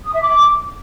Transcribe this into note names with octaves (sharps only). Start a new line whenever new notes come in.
D#6
E5
D6